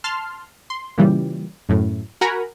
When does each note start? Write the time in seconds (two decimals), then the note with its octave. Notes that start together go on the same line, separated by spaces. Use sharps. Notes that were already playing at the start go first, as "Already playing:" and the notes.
0.04 A5 C6 F6
0.70 C6
0.98 A#2 C#3 E3 G3
1.69 F#2 A2
2.21 F#4 A#4 F#5 G#5 A#5 B5